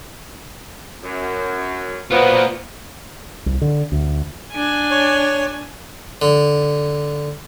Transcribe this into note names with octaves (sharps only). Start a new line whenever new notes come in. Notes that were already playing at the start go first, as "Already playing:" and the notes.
F#2
F#3 A#3 B3 F4 C5
C2
D3
D2
D4 G#5
C#5
D3